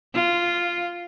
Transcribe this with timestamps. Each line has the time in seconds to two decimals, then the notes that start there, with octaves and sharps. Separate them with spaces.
0.14 F4